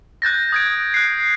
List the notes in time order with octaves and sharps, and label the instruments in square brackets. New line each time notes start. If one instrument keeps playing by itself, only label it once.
[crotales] F#6 G6 A6 A#6
D#6 G#6 D7
F#6 C7